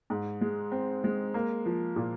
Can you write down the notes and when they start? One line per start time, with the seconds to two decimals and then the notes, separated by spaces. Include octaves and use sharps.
0.10 G#2
0.41 G#3
0.72 C4
1.04 G#3
1.34 A#3
1.66 F3
1.96 A#2